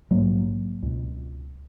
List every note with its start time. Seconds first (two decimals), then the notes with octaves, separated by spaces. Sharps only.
0.11 A#1 G#2 F#3 A#3
0.83 C#2 B2